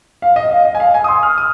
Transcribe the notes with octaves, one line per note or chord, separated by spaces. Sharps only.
F5
D#5
F5
D#5
G#5
F5
G#5
D#6
C6
F6
D#6